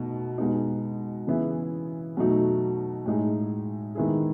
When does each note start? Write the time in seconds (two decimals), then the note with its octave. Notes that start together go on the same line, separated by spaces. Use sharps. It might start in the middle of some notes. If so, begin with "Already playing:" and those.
Already playing: B2 A3 D#4
0.38 B2 G#3 B3 D#4
1.27 C#3 E3 B3 E4 G#4
2.17 B2 F#3 A3 D#4 F#4
3.05 A2 G#3 D#4 G#4
3.95 D#3 G#3 B3 E4 G#4